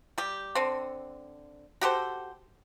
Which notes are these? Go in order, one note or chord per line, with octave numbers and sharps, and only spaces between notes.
G3 G4
D3 C4
F#4 G4 A4 C5